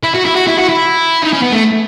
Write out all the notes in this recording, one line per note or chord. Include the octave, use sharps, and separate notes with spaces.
E4
F#4
E4
F#4
E4
F#4
E4
D#4
C#4
B3
A3